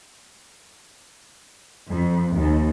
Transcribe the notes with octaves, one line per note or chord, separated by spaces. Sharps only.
F2
D#2